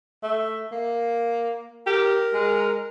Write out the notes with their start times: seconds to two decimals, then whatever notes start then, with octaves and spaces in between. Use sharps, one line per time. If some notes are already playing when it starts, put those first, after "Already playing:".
0.23 A3
0.72 A#3
1.87 G4 A#4
2.34 G#3